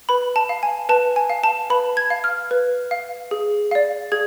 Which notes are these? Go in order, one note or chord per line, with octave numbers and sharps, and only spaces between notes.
B4 B5
A5
F5
G#5
B4 A5
G#5
F5
A5
B4 B5
G#6
F5
F6
B4
F5
G#4
D5 F5
G#4 G#6